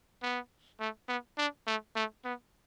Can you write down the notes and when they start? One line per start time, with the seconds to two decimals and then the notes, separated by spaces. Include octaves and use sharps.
0.22 B3
0.80 A3
1.08 B3
1.38 D4
1.67 A3
1.96 A3
2.24 B3